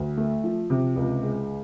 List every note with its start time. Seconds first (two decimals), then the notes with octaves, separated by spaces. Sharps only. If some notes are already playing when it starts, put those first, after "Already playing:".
Already playing: D2
0.17 A3
0.44 F3
0.70 C3
0.96 C#2
1.23 G#3